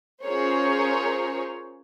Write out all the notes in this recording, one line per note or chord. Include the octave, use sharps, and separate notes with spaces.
C#4 F4 G#4 A#4 C5 C#5